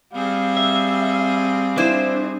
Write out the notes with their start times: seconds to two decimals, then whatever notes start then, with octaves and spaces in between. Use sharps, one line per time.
0.13 G3 C4 G#4 F5
0.57 E5
1.77 D4 E4 C5